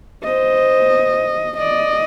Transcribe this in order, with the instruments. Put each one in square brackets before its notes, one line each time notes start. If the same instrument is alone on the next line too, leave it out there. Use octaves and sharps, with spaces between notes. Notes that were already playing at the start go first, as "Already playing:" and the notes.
[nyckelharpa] C5 [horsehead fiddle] D#5
[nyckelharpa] D5 [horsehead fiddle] D#5